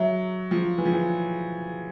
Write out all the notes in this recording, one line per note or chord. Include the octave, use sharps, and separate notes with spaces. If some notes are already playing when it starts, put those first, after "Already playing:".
Already playing: F#3 E5
F3
E3
F3
E3